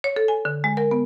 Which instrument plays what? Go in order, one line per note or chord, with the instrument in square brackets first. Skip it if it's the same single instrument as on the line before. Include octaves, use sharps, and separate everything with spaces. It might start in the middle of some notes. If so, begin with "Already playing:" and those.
[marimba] C#5
A4
G#5
D3
G#3
A#4
B3